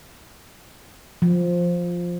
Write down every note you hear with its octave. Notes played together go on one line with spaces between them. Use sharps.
F3